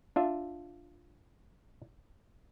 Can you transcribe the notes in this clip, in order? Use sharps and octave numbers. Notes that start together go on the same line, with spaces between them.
D4 F4 E5